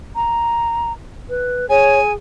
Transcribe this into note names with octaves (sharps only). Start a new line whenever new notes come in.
A#5
B4
G#4 C#5 G#5